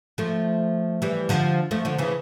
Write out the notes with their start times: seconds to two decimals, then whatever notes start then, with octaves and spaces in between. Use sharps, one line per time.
0.18 F3 A3
1.02 E3 G3
1.29 D3 F3
1.71 F3 A3
1.85 D3 F3
1.98 C#3 E3